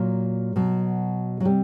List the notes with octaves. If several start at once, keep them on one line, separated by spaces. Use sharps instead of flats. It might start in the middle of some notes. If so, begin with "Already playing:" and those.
Already playing: A#2 F#3
B2 F#3
F#3
C3 G3